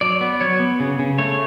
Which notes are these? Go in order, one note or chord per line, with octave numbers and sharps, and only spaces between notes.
F#3 D5
B3
F#3 C#5
B3
C#3
C#3
A3 C#5